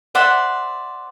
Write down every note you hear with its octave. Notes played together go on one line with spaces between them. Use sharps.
C5 D5 E5 F#5